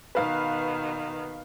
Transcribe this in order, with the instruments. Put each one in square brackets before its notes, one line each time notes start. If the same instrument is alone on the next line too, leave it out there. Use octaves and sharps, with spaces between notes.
[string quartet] B2 D#3 [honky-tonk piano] B4 F5